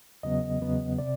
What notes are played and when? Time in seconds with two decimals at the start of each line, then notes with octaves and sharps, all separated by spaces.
0.23 E2 C#3 F#3 B3 D#5
0.61 E2 C#3 F#3 B3
0.98 C3 D5